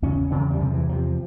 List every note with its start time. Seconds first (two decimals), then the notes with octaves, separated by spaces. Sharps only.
0.02 E2 C#3 C#4
0.31 E2 C#3 C4
0.51 G3
0.60 E2 C3 F3
0.74 E3
0.89 E2 C3 F3